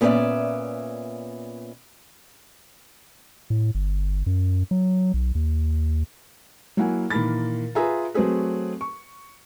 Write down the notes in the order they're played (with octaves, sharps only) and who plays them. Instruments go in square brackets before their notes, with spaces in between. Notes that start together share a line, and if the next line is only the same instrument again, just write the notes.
[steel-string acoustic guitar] A#2 B3 C#4 G#4 D5 E5
[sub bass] A2
G1
F#2
F#3
B1
D#2
[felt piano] F#3 A#3 E4 F#5 G#5
A#2 D#3 E3 A#4 B5 A6
F4 G#4 B4 E5 G#5 A#5
F#3 A3 C4 F#4 G#4 B4
C#6